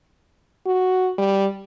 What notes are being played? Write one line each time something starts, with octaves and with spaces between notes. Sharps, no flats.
F#4
G3